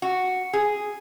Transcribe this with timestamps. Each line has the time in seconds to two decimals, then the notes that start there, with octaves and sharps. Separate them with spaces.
0.02 F#4
0.53 G#4